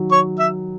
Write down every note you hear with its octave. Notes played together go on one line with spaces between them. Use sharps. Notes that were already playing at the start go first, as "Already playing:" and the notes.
Already playing: D#3 F#3
C#5 C#6
E5 E6